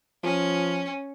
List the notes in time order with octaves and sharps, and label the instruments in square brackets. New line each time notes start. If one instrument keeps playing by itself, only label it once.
[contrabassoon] F3 [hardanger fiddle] C#4